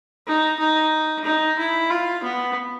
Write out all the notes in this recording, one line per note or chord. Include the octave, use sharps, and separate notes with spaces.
D#4
D#4
D#4
E4
F4
B3